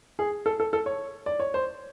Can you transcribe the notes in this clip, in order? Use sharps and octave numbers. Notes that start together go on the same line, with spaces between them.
G#4
A4
A4
A4
C#5
D5
C#5
C5